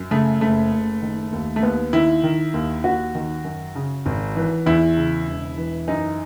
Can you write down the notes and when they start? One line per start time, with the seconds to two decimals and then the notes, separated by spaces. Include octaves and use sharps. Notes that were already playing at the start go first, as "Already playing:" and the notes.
Already playing: F#2
0.11 C#3 A3
0.41 F#1 A3
0.71 F#1
1.02 D#3
1.32 D#2
1.56 A3
1.63 D#2 B3
1.93 D#3 E4
2.23 D#3
2.54 D#2
2.84 D#2 F#4
3.15 D#3
3.45 F#2
3.75 C#3
4.06 G#1
4.36 E3
4.66 E2 E4
4.97 C#3
5.27 E1
5.58 E3
5.88 F#2 D#4